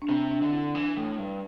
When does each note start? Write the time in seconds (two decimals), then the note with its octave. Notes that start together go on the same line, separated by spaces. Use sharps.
0.02 D4
0.09 C3 C4
0.31 D4
0.42 D3
0.53 E4
0.74 E3 D4
0.96 A2
1.18 G2